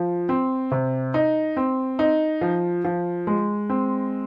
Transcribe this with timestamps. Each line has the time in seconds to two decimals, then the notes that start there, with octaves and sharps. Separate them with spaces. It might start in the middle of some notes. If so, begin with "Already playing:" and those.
Already playing: F3
0.29 C4
0.71 C3
1.14 D#4
1.57 C4
1.99 D#4
2.41 F3
2.85 F3
3.27 G#3
3.70 C4